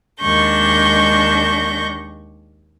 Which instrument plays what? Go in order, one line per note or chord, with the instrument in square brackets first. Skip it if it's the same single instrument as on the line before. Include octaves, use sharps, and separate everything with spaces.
[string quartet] D#2 G#3 D4 C#6 G6 A#6